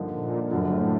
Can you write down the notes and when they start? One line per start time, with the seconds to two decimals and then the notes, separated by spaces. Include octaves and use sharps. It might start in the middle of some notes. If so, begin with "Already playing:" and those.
Already playing: G2 D3 F3 A#3 D#4
0.10 A#2
0.51 F#1 F#2 A2 D3